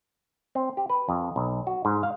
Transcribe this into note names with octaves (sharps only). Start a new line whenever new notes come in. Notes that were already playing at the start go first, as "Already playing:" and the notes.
C4
G4
B4
F2
B1
F#4
G#2
F5